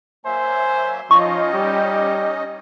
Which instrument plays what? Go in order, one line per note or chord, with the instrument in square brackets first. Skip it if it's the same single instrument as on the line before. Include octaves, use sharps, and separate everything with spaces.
[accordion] F#3 A#3 E5 [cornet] C5 [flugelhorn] G#5
[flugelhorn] F3 [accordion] C#4 D#4 D#5 [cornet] F4 [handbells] C#6
[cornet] G3 [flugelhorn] G4